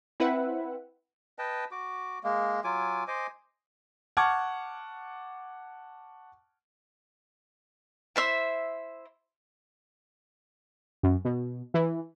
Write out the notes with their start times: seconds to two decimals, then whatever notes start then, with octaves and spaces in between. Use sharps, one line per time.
0.20 C4 E4 B4 E5 F#5
1.39 B4 D#5 G5 A5
1.71 F#4 D6
2.24 G#3 A#3
2.64 F#3 F4 G#5 D6
3.08 C5 D#5 G#5 D6
4.17 F#5 A5 C#6 D6 F6 G#6
8.16 E4 C5 E5
11.03 F#2
11.25 B2
11.74 E3